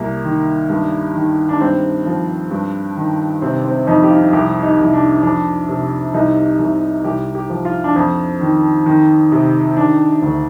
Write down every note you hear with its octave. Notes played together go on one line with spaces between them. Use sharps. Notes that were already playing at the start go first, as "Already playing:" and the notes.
Already playing: C2 A#3
D#3
G2
D#3
D4
G2 C4
F3
G2
D#3
C3 C4
C4
F2 D#4
G4
F4
C2 G4
D#4
C2
D4
F2 D4
C3
C2 D#4
C2
C2 G4
G4
F3
F4
D4
F2 C4
D#3
D#3
C3
D#3 D4
D2